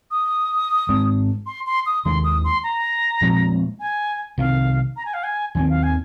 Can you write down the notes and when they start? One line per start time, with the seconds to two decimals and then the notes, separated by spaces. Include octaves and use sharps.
0.11 D#6
0.89 G#2 G#3 C4
1.46 C6
1.66 C6
1.86 D#6
2.05 D#2 D#3 G#3 C6
2.24 D#6
2.44 C6
2.64 A#5
3.22 A#2 F3 G#3 C4
3.80 G#5
4.38 C2 C3 D#3 F5
4.96 A#5
5.05 G#5
5.14 F5
5.24 G#5
5.55 D#2 D#3 C4 G#5
5.69 F5
5.83 G#5